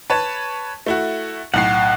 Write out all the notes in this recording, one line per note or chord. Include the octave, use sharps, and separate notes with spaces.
B4 C#5 A5
A3 E4 F#4
B1 A2 F#5 C7